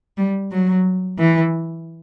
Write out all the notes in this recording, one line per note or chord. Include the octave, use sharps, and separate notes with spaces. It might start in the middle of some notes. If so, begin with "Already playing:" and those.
G3
F#3
E3